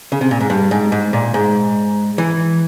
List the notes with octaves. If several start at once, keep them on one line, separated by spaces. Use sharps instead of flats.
C#3
C3
A#2
G#2
G2
G#2
G#2
A#2
G#2
E3